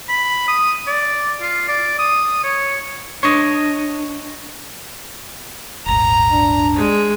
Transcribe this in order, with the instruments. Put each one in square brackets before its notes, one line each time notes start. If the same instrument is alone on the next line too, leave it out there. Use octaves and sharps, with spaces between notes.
[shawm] B5
D#6
D5
F4
D5
D#6
C#5
[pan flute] D4 [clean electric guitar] C#5 D#5
[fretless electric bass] D#1 G#1 [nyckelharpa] A#5
[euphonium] D4
[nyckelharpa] G#3